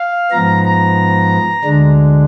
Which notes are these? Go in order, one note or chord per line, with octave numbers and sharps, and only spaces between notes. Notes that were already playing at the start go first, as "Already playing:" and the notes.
Already playing: F5
G#2 F3 B3 A#5
A#5
D2 D3 G#3 D4